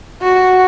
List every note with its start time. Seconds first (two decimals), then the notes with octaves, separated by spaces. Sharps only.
0.22 F#4